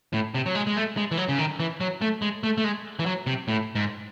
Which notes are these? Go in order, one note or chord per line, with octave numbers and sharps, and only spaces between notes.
A2
C3
F#3
G#3
G#3
A3
G#3
E3
F#3
C#3
D#3
E3
F#3
A3
G#3
A3
A3
G#3
E3
F#3
C3
A2
G#2